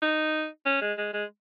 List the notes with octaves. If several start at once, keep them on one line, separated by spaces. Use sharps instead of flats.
D#4
C#4
G#3
G#3
G#3